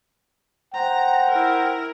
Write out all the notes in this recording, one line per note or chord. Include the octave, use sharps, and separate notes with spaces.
C5 F#5 G5 A#5
E4 A#4